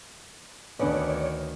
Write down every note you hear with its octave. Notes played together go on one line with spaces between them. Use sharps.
D2 D#3 B3 C#4 D4 B4 C#5 D5